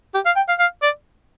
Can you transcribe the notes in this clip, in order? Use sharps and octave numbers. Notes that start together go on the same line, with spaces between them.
G4
F5
G5
F5
F5
D5